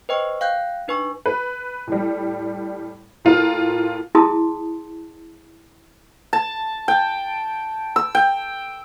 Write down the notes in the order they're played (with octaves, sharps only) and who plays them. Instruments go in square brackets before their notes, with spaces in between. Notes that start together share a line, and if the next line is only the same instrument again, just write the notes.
[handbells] B4 C5 D#5 G5 C#6
F5 G5 F#6 G6
D4 D#4 B4 G#5 C#6
[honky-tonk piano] B4
A2 G3
A2 F4 A#4 F6
[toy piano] E4 G#4 A5 C6 D#6
[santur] A5
G5
E6
G5